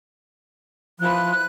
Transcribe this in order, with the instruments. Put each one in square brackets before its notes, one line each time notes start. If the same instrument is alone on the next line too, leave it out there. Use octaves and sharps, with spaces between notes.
[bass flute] F3 [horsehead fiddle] E4 B4 [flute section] F#6